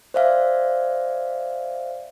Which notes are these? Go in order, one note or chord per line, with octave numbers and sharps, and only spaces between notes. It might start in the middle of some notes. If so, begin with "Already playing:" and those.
C5 D5 E5 F5